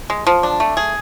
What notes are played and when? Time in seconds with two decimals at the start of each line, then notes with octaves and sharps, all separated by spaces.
0.10 G#3
0.27 F3
0.43 D4
0.60 A3
0.77 G#4